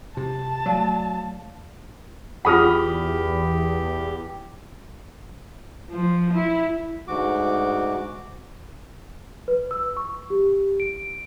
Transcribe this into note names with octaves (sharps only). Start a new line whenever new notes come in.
C3 A5
F#3 A3 D5 F5
E2 F4 G4 G#4 F#5 B5 D#6 F6
F3
E4
D2 G#2 F#4 D6
B4
E6
C#6
G4
D7